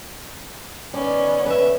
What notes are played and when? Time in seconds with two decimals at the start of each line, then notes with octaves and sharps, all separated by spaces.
0.94 D#3 B3 C#4 D5
1.46 B4 E5